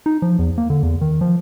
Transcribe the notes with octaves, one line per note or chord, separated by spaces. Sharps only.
D#4
F3
E2
A#3
D3
E2
D#3
F3